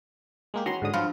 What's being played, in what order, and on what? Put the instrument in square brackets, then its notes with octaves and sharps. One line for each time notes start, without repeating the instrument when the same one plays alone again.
[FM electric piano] G#3 A#3 G4
[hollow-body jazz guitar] E3 C#4 F#4 [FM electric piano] A#5 C6
[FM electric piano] G#2 D3 D#6
[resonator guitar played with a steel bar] G2 [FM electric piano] F3 F4